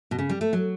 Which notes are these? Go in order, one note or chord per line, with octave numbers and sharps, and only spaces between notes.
B2
C#3
G3
A3
F#3